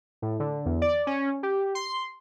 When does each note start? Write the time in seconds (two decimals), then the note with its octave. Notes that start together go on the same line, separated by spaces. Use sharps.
0.22 A2
0.40 D3
0.66 E2
0.82 D5
1.07 C#4
1.43 G4
1.75 C6